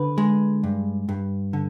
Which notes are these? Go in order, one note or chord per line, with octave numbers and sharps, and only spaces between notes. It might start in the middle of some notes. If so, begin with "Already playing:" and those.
Already playing: D3 B4
G#3
G2
G2
D3